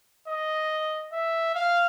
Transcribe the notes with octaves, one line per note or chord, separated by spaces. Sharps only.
D#5
E5
F5